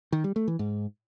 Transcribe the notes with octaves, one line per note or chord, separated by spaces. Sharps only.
D#3
G3
A3
E3
G#2